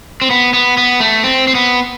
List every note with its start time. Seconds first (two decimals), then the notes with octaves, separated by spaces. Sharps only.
0.22 C4
0.30 B3
0.53 B3
0.77 B3
1.00 A3
1.24 C4
1.48 C4
1.55 B3